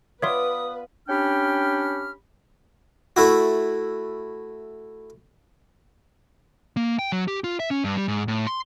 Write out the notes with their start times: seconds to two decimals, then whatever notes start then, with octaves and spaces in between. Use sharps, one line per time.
0.22 B3 F4 B4 C#5 D5 E5 C6 D#6
1.09 C#4 D4 G4 G5 B5 F6
3.16 A3 E4 F#4
6.77 A#3
6.99 G5
7.12 F#3
7.28 G4
7.44 F4
7.60 E5
7.71 C#4
7.84 G2
7.97 G3
8.08 G#2
8.28 A2
8.47 C6